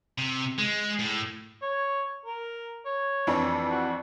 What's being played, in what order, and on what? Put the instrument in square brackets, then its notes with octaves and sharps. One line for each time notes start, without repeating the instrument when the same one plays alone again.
[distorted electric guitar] C3
G#3
A2
[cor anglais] C#5
A#4
C#5
[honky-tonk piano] F2 E3 D4
[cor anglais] F#4